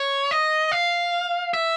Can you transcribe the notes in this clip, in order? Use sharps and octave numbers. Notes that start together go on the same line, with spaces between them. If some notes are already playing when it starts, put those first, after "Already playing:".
Already playing: C#5
D#5
F5
E5